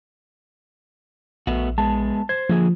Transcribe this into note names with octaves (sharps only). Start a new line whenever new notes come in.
A#1 A3 B3 F#4
G#3 B3 A5
C5 G#6
D3 F3 A#3 G#4